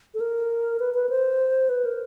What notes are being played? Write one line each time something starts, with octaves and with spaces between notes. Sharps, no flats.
A4
A#4
B4
B4
C5
B4
A#4